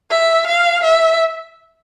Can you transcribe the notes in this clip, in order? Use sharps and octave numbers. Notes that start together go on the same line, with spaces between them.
E5
F5
E5